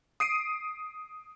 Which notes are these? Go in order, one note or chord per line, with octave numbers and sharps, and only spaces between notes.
D#6 C7 D7 D#7